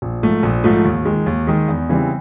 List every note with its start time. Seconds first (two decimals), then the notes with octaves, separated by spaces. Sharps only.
0.02 A#1
0.23 G#2 F3 A3
0.43 A#1
0.64 G#2 F3 A3
0.85 D#2
1.05 D#3 G#3
1.26 D#2
1.47 D#3 G#3
1.68 E2
1.89 C#3 E3 G3 C4